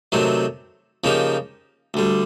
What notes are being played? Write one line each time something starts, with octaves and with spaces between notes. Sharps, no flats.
C3 D#3 F#3 A3 C4
C#3 F3 A#3 D#4 G4
D2 D3 G3